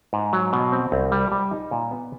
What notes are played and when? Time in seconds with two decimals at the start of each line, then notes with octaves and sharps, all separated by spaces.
0.13 G#2
0.33 F#3
0.53 B2
0.72 C4
0.92 C2
1.12 G3
1.32 G3
1.51 D#4
1.71 A#2
1.91 B3